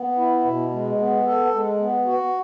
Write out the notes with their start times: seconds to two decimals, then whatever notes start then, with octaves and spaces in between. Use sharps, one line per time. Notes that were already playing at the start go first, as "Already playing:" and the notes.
Already playing: B3
0.17 E4
0.44 B2
0.71 G#3
0.98 B3
1.25 A4
1.52 G#3
1.78 B3
2.05 F#4